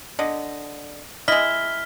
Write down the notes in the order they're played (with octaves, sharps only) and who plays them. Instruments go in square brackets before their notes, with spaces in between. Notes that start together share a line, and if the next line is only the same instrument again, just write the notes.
[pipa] D3 [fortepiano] D#5
[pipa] G#3 E4 [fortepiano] D#5 [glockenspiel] F6 B6 G7